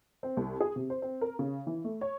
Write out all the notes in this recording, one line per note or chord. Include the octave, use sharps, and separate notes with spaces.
C4
C2
G#4
C3
C5
C4
A#4
C#3
E3
A3
C#5